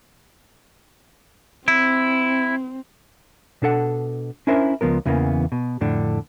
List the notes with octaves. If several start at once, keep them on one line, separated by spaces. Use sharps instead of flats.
C4 E4
B2 D4 A4 F#5
C#4 D4 E4 A#4 C5 E5
C#2 F3 B3 A#4
E2 C#3 E3 A#3 B3
B2
F2 A2 D3 D4